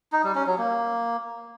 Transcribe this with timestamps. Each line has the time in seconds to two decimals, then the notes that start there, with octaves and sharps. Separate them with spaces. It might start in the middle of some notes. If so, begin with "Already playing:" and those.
0.12 D#4
0.24 G3
0.35 C#4
0.47 F#3
0.58 A#3